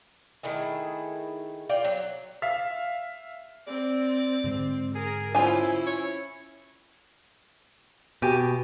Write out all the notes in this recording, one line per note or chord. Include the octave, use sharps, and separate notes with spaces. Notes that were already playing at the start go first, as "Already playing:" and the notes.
D#3 A3 E4 G#4
F4 D5 G5
F#3
E5 F5
C4 D5
G#2 D3 G#3 C4
G#4 A#4
C#4 E4 F4 C5 G#5
C#5
B2 G4 G#5